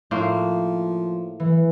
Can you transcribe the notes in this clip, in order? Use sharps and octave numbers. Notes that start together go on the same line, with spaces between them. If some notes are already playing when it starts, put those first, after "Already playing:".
A2 F3 A#3 C5
E3